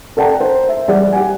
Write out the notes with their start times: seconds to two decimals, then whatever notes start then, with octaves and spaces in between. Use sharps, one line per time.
0.17 A4 D5 F#5 G5 A5 A#5
0.40 C5
0.69 E5
0.88 G3 G#4 D5 F#5
1.12 G4 F#5 G#5